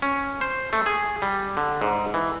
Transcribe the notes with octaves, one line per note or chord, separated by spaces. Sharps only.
C#4
C5
A3
G#4
G3
D3
G#2
E3